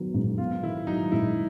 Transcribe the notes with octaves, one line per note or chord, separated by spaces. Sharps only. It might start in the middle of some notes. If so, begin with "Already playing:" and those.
Already playing: D#3 F#3 B3
G#2
B3 F4
D#3 E4
F#3 D#4
G#2 E4